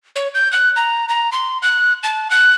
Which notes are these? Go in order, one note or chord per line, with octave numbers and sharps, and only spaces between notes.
C#5
G6
F#6
A#5
A#5
C6
F#6
A5
F#6